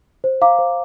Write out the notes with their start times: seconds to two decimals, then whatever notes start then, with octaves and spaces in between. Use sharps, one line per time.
0.24 C5
0.42 F5 A#5 D6
0.59 C5